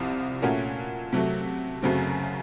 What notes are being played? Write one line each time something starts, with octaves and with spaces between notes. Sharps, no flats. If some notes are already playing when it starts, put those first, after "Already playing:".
Already playing: C2 C3 F3 C4 F4
A#2 A3 C#4 F#4 A#4
C3 F#3 A3
F#2 C#3 F#3 A3 C4